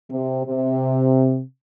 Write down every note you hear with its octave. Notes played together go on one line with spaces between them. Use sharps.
C3
C3